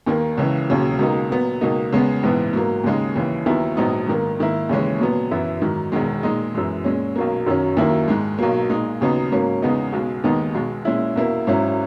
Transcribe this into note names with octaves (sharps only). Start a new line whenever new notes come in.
D#2 D#3 A#3
C#2 C#3 E3
E1 D#2 C#3 F#3
C#2 B2 A#3 D#4
A#2 F#3 B3
C#2 B2 A#3 D#4
E2 C#3 G#3 B3
A#1 G#2 E3 B3
G#2 F#3 A#3
D#2 C#3 G#3 D#4
D#2 C#3 E3
D#2 D#3 F#3 B3 E4
A#1 G#2 F#3 B3 D#4
G#2 D#3 A#3
G#2 D#3 A#3 E4
D#2 C#3 E3 G#3 C#4
A#2 F#3 B3
F#2 E3 B3 E4
G#2 D#3 F#3
E1 E2 D#3 G#3
A#2 G#3 D#4
F#2 E3 G#3
A#2 G#3 C#4
B1 B2 F#3 A#3
F#2 D#3 F#3 C#4
D#2 D#3 F#3 A#3 E4
G#2 D#3 G#3
B1 B2 F#3 A#3
A#2 G#3 D#4
D#2 C#3 F#3 B3 D#4
G#2 F#3 A#3 C#4
E2 C#3 G#3 B3 D#4
B1 B2 G#3
D#2 D#3 G#3 B3 D#4
B1 B2 G#3
A#2 G#3 C#4 E4
E2 B2 A#3 E4
G#1 G#2 F#3 C#4 E4